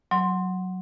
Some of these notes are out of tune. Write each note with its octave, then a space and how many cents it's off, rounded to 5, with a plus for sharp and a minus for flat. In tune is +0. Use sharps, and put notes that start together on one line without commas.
F#3 +0 C6 +5